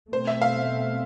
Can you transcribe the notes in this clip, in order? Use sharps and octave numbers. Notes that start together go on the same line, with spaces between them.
B2 A3 C4 C5
E5
F5